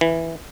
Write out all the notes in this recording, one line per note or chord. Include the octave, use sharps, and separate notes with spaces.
E3